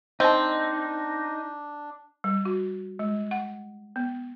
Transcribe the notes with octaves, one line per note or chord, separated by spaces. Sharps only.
C4 D4 D#4 D#5 A5
G3
F#4
G#3
F#5
B3